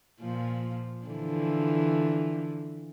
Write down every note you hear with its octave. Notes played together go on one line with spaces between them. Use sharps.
A#2 F3
D3 E3 F3